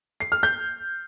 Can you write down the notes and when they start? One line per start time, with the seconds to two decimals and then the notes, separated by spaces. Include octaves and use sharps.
0.20 C7
0.32 F6
0.43 G6